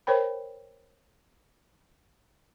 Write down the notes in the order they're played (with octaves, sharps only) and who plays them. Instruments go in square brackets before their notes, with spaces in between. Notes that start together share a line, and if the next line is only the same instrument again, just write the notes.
[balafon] A#4 C5 C#5 G5 B5